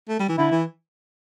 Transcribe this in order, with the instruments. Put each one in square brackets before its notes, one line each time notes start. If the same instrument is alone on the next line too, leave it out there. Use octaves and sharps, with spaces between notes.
[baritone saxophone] A3
G3
E3
[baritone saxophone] D3 [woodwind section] E4
[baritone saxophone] E3